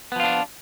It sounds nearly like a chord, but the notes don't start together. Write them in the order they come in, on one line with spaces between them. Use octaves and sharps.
B3 F3 F4 D4